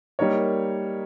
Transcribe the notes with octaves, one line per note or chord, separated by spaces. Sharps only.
G3 A#3 D#4 A#4 C#5